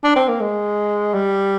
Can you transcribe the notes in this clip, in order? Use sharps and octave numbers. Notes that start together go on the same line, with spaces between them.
D4
C4
A#3
G#3
G3